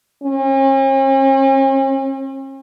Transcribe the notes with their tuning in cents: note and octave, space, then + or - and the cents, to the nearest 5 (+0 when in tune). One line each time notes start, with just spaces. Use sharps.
C#4 -45